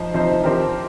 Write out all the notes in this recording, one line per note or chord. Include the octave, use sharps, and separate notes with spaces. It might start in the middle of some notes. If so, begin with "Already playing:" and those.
Already playing: F3 D#4 C5
C3 F3 D#4 C5
F3 C4 G4 A#4